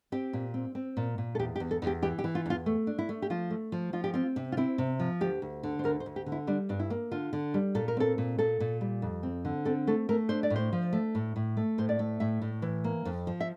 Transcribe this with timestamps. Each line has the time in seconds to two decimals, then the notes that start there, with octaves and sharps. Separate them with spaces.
0.12 C4 G4
0.33 A#2
0.54 C4
0.75 C4
0.97 A#2
1.18 A#2
1.35 A4
1.39 E2 G4
1.56 G4
1.60 E2
1.71 A4
1.82 E2 G4
2.02 E3 G4
2.19 G4
2.24 E3
2.35 F4
2.46 E2 F4
2.66 A3
2.87 D4
2.99 E4
3.09 A3
3.22 G4
3.30 F3 F4
3.50 A3
3.72 F3
3.93 F3 F4
4.04 G4
4.14 C4 F4
4.36 C3
4.52 F4
4.57 C4 E4
4.78 C3
5.00 F3
5.21 D2 G4
5.42 D2
5.63 D3
5.79 C5
5.84 D2 A#4
6.00 C5
6.06 D2
6.16 G4
6.26 D3
6.32 E4
6.47 G3 D4
6.69 G2 D4
6.80 E4
6.90 A#3
7.11 D3 F4
7.33 D3
7.54 G3
7.75 A#2 A4
7.88 A#4
7.97 C4 A4
8.18 A#2
8.39 A#2 A4
8.60 A#2
8.81 G3
9.02 F2
9.23 C4
9.45 D3
9.65 C4 A4
9.87 A3 A4
10.09 A3 A#4
10.29 D4 C5
10.43 D5
10.50 A2
10.56 C5
10.73 F3
10.93 A3
11.15 A2
11.36 A2
11.57 A3
11.78 A2 C5
11.89 D5
11.99 A3
12.20 A2 E5
12.42 A2
12.62 E3
12.84 A#3
13.05 F2
13.27 F3
13.40 E5